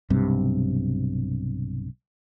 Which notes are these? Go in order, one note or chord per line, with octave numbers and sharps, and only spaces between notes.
B1 G2 C3